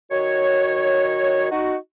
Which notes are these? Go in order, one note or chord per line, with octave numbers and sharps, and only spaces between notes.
D#3 F#4 C#5
D#4 F#4